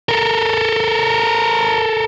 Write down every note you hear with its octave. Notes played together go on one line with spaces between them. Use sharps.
A4 A#4